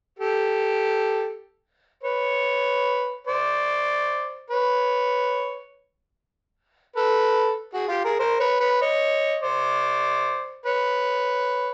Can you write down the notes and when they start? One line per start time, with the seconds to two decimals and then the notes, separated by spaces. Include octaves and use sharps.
0.19 G4 A4
2.03 B4 C#5
3.27 C5 D5
4.50 B4 C#5
6.96 A4 B4
7.73 F#4 G#4
7.88 F4 G4
8.05 G#4 A#4
8.20 A#4 C5
8.40 B4 C#5
8.60 B4 C#5
8.81 C#5 D#5
9.43 C5 D5
10.66 B4 C#5